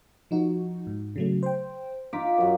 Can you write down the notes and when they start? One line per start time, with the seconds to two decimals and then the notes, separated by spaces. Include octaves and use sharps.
0.31 F3 D#4 F#4
0.87 G#2
1.16 C#3 F#3 A3
1.43 C5 G5
2.13 D#4 F4 A#5 D6 B6
2.38 F#2 F#3